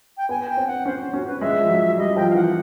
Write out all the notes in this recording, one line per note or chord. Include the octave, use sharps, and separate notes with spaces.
G5
B3 G#5
G5
C4
F#5
C#4 C5
C5
C#4 F#4
B4
G#3 E5
F3
F#3
G3 D#5
F3 G5
F5
E3 F#5